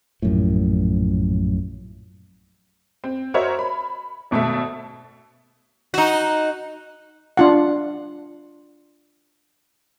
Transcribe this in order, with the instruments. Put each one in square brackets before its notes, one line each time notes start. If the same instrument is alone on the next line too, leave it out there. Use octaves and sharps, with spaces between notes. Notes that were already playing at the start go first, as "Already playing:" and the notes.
[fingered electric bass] A#1 F#2 A2
[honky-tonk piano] C4
F#4 A#4 C5 C#5 D#5 E5
B5
G#1 B2 A3 A4 E5
[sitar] D#4 F#4
[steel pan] D4 F4 F#5